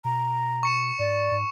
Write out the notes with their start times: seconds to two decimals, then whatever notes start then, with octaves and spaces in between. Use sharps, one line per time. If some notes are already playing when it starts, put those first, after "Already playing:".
0.05 B2 A#5
0.63 C#6 C#7 E7
0.99 G#2 D5
1.32 G#2